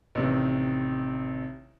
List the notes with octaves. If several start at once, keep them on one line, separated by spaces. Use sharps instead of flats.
A1 C3 D#3